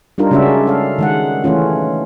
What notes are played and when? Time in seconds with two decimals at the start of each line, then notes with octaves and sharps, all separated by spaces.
0.18 G3 D4 D#4 F4 A#4
0.31 C#3 G#3 C#4 D4 F#4 E5
0.66 G#3 A4 F5
0.98 D#3 G#3 F#5
1.44 E3 A3 C#4 F4